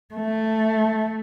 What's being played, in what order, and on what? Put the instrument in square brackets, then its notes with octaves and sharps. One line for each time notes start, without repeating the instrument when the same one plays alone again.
[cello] A3